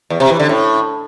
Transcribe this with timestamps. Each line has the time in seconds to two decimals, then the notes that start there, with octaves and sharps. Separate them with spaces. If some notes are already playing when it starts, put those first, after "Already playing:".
0.10 E2
0.20 C3
0.30 E3
0.39 D3
0.49 A2